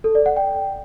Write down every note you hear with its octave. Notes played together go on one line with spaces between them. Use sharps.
A4
D5
F#5
G5